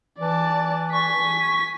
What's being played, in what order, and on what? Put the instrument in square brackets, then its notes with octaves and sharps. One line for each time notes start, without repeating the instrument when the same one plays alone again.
[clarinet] E3 [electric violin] D5 A5
[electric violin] G#5 B6 [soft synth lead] C#6